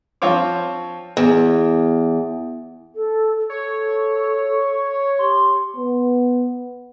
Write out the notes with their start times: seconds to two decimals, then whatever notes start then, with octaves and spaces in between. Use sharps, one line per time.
0.22 F3 C4 F4 C5 C#5 D6
1.17 E2
2.95 A4
3.50 A4 C#5
5.19 G4 C6
5.76 B3